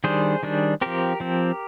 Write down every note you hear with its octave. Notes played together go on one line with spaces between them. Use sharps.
D#3 G3 D4 G#4 C5
D#3 G3 D4
F3 C4 G4 A#4
F3 C4